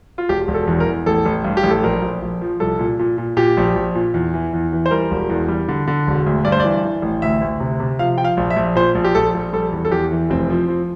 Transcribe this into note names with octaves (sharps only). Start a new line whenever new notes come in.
F4
E1 G4
E1
A4
E2
A#4
E2
A1 A4
A1
G2
G4
A1
A4
A#1 A#4
A#1
A#1
F3
C2 A4
A#2
A#2
A#2
A#2 G4
A#1
A#1
A#2
E2
E3
E2
E3
C5
G3 A#4
E1
E2
G3
D3
D3
E1
D2
G2 D5
C5
E3 D5
E3
A1
D2 E5
D2
C3
C3
F3 F5
F3 G5
F5
A#1
E5
A#1
A#2 C5
A#1
G4
A#1 A4
A#1
G3 A4
E2
A4
E2 G4
E3
F1 C4
F3
F3